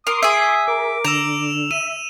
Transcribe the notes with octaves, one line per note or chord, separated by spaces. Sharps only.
A#4 C6 D6 D#6
G#4 E5
A#4 D6
D3 A#5 E6 E7 F7
E5 D#7